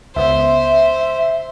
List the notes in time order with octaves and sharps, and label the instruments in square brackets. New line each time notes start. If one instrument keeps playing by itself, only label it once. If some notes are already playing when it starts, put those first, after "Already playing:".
[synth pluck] C#2 B3 [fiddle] C5 [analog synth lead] E5